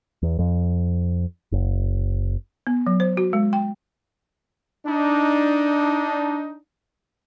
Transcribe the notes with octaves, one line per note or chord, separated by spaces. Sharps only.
E2
F2
F#1
B3
F#3
C5
F#4
G#3
G5
D4 D#4